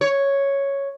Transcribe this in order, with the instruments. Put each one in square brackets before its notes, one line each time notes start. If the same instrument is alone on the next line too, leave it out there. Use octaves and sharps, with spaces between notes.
[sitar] C#5